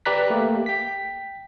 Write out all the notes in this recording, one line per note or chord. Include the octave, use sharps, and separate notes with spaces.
G4 B4 D5 A#5 F#6 B6
A3 A#3 G4
G5 B6